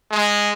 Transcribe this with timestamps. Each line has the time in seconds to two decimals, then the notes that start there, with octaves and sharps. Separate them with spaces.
0.11 G#3